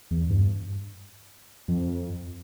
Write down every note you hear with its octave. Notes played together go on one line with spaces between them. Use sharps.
E2
G2
F2